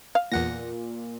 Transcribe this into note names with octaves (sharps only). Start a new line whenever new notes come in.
F5
E2 A#2 F#5 A#6